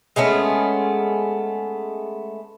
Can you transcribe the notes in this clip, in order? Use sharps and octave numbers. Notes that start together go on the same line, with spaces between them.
G#3 A3 B3 C#4